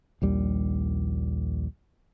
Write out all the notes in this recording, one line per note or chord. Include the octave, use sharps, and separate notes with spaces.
A#1 D#2 G3